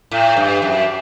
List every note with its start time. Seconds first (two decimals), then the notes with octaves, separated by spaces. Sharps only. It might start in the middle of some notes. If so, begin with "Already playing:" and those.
0.11 A2
0.37 G2
0.62 F#2